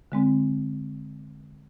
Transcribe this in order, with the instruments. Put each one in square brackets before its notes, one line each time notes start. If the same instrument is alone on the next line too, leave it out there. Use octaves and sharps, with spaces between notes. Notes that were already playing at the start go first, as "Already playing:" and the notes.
[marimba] D3 G#3 C4